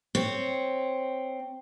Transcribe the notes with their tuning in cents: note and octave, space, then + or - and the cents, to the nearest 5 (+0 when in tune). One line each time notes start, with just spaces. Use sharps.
C4 +0 C#5 +0